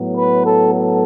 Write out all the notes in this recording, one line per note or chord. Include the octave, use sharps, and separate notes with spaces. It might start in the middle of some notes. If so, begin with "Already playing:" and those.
Already playing: A2 F#3 B3
B4
A4
A4